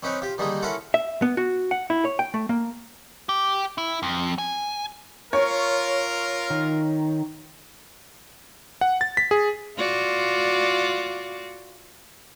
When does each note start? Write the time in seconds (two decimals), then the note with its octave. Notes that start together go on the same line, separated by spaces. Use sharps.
0.03 C4 C#4 D#4 B4 C#5
0.22 F4 G4
0.38 D3 D#3 G3 G#3 A#3 D#4
0.62 C#4 E4 F4 A4 A#4 F#5
0.94 E5
1.22 B3
1.37 F#4
1.71 F#5
1.90 E4
2.05 C#5
2.19 G5
2.34 A3
2.49 A#3
3.29 G4
3.78 E4
4.03 F2
4.38 G#5
5.33 F4 A#4 C#5
6.50 D#3
8.81 F#5
9.01 A6
9.17 B6
9.31 G#4
9.77 F4 F#4 D5